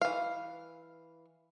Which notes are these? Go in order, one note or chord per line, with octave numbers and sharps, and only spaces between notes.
E3 F5